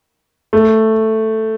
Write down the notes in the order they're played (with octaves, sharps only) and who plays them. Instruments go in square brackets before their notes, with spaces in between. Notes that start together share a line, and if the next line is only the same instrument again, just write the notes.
[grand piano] A3